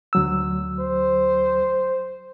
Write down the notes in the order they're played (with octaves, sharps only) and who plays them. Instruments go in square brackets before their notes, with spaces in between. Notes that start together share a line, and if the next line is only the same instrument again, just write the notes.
[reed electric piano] D2 F#3 E6
[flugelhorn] C5